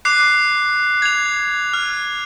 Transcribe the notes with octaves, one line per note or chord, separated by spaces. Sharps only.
D6 F#6 C7
G#6 F7
F6